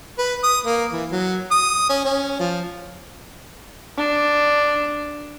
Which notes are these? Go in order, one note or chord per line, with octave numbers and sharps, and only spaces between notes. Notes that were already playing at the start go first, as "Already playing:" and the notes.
B4
D#6
A#3
E3
F#3
D#6
C#4
C#4
F3
D4